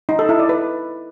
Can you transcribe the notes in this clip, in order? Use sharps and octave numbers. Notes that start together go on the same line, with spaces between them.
D#4
A4
E4
D5
B4